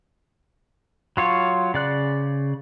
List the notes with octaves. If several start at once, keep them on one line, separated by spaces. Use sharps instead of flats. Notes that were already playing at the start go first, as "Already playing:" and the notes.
F#3 F4 C#5
C#3 D5 F#6